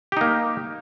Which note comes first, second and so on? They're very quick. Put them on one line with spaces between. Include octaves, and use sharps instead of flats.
G4 D#4 A#3